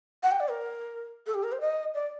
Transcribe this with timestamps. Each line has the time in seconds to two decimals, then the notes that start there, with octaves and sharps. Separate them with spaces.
0.23 F#5
0.31 G5
0.40 D5
0.49 A#4
1.27 A4
1.34 G4
1.43 A#4
1.52 C5
1.60 D#5
1.94 D5